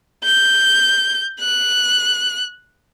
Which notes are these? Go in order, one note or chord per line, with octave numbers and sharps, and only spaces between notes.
G6
F#6